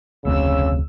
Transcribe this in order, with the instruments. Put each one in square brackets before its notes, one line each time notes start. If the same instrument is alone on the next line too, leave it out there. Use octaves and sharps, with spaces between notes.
[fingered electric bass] F1 D2 C4 [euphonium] C#3 [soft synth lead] E6